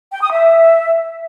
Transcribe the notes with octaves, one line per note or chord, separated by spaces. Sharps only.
G5
D#6
E5